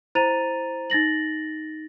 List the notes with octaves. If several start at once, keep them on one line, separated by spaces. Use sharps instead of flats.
E4 C5 A#5 A6 D#7 F7
D#4 A6 A#6 F#7